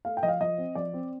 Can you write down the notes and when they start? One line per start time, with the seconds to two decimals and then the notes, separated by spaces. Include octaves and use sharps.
0.05 A3 F5
0.17 G5
0.23 F3 D#5
0.28 F5
0.41 F3 D#5
0.58 C4
0.75 F3 D5
0.93 C4